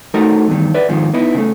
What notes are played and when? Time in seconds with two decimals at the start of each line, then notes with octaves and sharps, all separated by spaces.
0.14 A3 D#4 F#4 A#4
0.48 E2 G2 D#3
0.74 B4 D5 E5
0.89 G#2 D#3 F3
1.14 B3 D#4 E4
1.35 C#3 A3